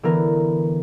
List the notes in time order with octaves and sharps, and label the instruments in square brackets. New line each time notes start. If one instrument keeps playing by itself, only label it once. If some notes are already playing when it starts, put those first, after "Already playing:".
[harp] D3 E3 B3 A#4